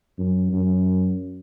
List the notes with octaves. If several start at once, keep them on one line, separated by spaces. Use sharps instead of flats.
F#2
F#2